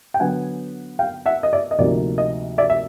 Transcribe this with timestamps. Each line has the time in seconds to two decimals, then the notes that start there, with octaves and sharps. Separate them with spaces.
0.14 G5
0.19 D3 F#3 B3 F#5 G#5
0.99 F5 G5
1.26 E5 F#5
1.43 D#5
1.53 D5 E5
1.71 D#5
1.79 D2 C3 F3 A#3 D#4 D5
2.18 D#5
2.58 D5 E5
2.70 E5